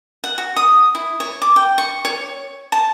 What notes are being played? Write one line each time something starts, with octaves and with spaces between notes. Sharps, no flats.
F#5
F#4
D#6
E4
C#5
D6
G5
C#6
C#5
A5